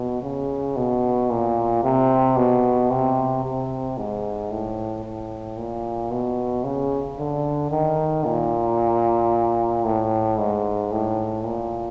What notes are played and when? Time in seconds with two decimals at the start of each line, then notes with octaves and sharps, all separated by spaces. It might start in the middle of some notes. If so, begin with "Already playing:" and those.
Already playing: B2
0.23 C#3
0.76 B2
1.30 A#2
1.84 C3
2.37 B2
2.90 C3
3.44 C3
3.98 G#2
4.51 A2
5.04 A2
5.57 A#2
6.11 B2
6.64 C#3
7.18 D3
7.71 D#3
8.25 A#2
9.85 A2
10.38 G#2
10.92 A2
11.45 A#2